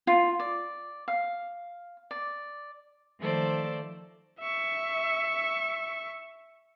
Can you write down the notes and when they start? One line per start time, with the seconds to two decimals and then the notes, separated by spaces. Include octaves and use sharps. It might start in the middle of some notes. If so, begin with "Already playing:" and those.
0.07 F4
0.39 D5
1.08 F5
2.11 D5
3.19 D#3 F3 A3 A4 C5 D5
4.40 E5 C#6